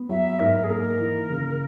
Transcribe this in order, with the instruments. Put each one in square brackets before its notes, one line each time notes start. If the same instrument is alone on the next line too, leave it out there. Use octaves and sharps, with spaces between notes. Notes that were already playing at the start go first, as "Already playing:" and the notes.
Already playing: [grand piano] B3
[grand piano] F#3 [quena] E5
[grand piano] G#2 [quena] A#4
[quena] G#4
[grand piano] A#3 [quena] A#4
[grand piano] E3
C#3